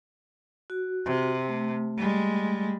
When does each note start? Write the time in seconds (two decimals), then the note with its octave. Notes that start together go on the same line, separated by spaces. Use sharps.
0.70 F#4
1.06 C3
1.48 A3
1.97 G3 G#3